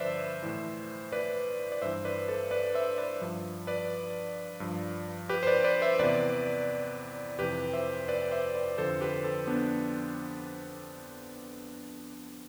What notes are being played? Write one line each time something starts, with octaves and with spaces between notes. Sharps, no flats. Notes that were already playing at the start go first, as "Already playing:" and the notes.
Already playing: G2 D3 F3 B4 C5 D5 E5
A2 E3
B4 D5
D5
G2 E3 C5 E5
B4 D5
A4 C5
B4 D5
C5 E5
B4 D5
G2 F3
B4 D5
G2 F3
G4 B4
C5
B4 D5
B4 D5
C5 E5
E2 C3 E3 B4 D5
F2 C3 E3 G4 B4
C5 E5
B4 D5
C5 E5
B4 D5
F2 D3 F3 A4 C5
G4 B4
A4 C5
B3 D4